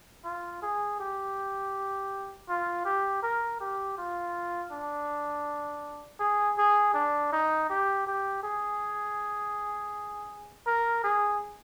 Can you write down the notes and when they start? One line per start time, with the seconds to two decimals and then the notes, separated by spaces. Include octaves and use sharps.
0.25 F4
0.62 G#4
1.00 G4
2.49 F4
2.85 G4
3.23 A#4
3.60 G4
3.98 F4
4.72 D4
6.20 G#4
6.58 G#4
6.94 D4
7.32 D#4
7.70 G4
8.07 G4
8.43 G#4
10.66 A#4
11.04 G#4